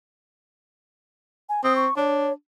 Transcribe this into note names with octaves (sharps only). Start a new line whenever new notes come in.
G#5
C4 D#6
C#6
D4 C#5